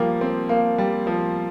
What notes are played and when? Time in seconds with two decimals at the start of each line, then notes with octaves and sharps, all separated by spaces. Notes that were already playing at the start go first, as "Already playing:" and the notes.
Already playing: F3 G3 A#3
0.21 C4
0.49 A#3
0.78 G3
1.07 F3